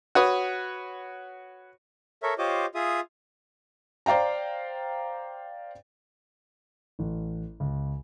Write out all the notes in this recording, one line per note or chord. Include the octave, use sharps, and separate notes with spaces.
F#4 B4 C#5 D#6
A4 A#4 C#5 E5
F4 G4 C5 C#5 D#5 D6
F4 G#4 E5 D#6
C5 D5 F5 G5 A#5
A1
C#2